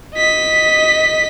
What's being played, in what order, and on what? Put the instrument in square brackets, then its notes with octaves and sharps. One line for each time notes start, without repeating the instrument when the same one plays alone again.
[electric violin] D#5 B6